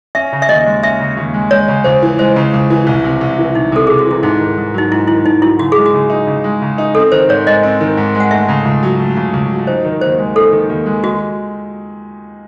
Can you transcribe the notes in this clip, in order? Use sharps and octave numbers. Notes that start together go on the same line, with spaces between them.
C#4 E5
C#3
E5
D#2 D#5
G#3
C#4 E5
C#3
D#2
G#3
G#3 C#5
C#3
C#2 C5
E3
G#3 C5
C#3
C#2
E3
C2
C3
C2
E3
C2 D#4
C3 A4
C2 G#4
F#4
E3 E4
G#2 D#4
D#3
G#2
F#3 D#4
G#2 E4
D#3 E4
G#2 D#4
F#3 E4
C#3 F#4
G#3 G#4
F#4
C#3
D#4
C#3
G#3
C#3
D#4
C4 A4
D#3 C5
G#2 C#5
G#3 D#5
C4
D#3
G#2
G#3
F#5
A3 E5
C#3
C#2
F#3
A3
C#3
C#2
F#3
D#4 C5
D#3
D#2 C5
G#3
D#4 A4
D#3
D#2
G#3
G#3 F#4